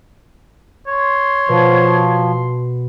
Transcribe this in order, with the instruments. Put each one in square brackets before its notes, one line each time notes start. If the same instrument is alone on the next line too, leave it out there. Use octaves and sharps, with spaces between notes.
[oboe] C#5 [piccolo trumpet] C6
[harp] B2 [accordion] F3